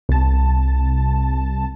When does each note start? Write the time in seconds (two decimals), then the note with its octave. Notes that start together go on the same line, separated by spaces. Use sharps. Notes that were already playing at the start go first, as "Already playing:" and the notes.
0.09 C2 A5